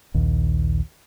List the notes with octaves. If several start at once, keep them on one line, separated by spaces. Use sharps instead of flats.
A#1 D#2